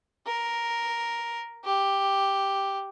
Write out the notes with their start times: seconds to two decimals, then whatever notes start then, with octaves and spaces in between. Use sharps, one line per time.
0.26 A#4
1.65 G4